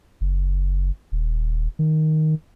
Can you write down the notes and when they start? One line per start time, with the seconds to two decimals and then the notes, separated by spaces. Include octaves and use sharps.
0.21 F#1
1.12 D#1
1.79 D#3